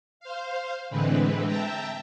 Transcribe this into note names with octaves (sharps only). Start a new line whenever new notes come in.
C5 F5
A2 D3 E3 G#3 C4 B4
E5 G5 A5 A#5